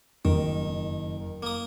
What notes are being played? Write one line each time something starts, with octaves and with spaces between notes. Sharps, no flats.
F#1 D#3
A#3 D#6